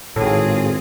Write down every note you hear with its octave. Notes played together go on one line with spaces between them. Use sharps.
G#1 A2 C4 F4 G#4 A4 C#5